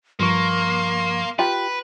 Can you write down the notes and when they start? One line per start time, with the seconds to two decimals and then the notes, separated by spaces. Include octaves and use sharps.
0.19 G2 F3 A#3 C6 C#6
1.39 F4 G4 B4 A#5